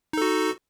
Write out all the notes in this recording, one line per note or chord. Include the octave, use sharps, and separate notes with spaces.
D#4 F#4 A4